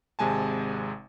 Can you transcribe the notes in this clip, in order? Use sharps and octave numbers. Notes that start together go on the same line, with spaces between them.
G#1 C3 G#3 G#5 A5